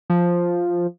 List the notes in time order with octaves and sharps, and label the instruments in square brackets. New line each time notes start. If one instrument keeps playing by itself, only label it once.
[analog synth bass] F3